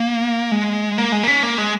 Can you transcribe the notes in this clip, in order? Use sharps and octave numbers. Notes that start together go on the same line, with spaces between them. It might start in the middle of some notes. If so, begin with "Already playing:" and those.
Already playing: A#3
G#3
A#3
G#3
A#3
C#4
A#3
G#3